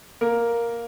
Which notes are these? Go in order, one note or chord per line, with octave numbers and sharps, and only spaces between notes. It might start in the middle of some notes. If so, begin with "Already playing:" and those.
A#3 A#4